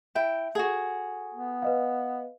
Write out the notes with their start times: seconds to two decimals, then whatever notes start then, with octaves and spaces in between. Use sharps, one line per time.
0.15 E4 E5 G5
0.55 F#4 G#4 A4 F#5
1.34 B3
1.62 B4 D#5 F5